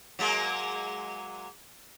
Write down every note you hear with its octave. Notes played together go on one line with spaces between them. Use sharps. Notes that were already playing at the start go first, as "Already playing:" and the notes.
F#3 G#3 A#3